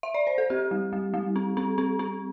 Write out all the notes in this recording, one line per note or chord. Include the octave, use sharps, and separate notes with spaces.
E5
D5
C5
A4
C4 G4
G3
G3
G3
C4
C4
C4
C4